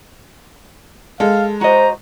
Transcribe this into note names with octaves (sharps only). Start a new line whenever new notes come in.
G#3 A4 F5
F#4 C5 D#5 A#5